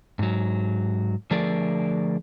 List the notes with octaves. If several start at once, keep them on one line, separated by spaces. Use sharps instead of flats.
G#2 F#3
D3 F3 A3 G#4 A#4 D5